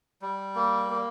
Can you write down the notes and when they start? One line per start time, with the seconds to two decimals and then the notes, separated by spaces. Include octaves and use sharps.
0.22 G3
0.56 A#3
0.90 A#3